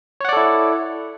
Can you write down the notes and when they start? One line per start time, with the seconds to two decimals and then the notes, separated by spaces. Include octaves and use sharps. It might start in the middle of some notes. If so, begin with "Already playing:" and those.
0.21 C#5
0.25 F#5
0.29 D5
0.33 A4
0.37 E4